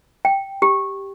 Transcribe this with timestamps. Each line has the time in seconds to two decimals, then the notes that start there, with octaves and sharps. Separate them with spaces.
0.25 G5
0.62 G4